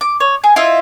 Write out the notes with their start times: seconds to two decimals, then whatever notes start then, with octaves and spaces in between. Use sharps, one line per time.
0.01 D6
0.20 C#5
0.44 G#4
0.56 E4 F4 D#5 E5